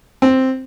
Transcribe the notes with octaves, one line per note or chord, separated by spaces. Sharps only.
C4